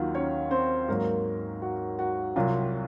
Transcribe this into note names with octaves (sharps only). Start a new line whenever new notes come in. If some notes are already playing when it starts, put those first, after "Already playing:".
Already playing: D#2 D#3 F#3 F4 F#4 F5 F#5
C#4 C#5
C4 C5
G#2 F#3 A#3 A#4
F#4
F#4
C2 C3 F#3 F4